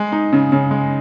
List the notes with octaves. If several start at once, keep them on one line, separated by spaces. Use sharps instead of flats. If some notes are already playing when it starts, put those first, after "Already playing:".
Already playing: G#3
D#4
C#3
C#3
G#3